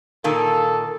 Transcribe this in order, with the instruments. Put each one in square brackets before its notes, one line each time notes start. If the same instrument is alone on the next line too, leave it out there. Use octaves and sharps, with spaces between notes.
[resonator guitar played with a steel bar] A#2 D#3 A#3 [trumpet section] A4